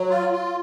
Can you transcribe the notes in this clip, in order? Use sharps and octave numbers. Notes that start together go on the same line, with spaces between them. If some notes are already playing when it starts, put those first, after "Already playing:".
Already playing: F#3
F4
F4